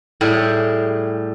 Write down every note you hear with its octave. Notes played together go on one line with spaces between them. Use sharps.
A2 G3 G4 G#4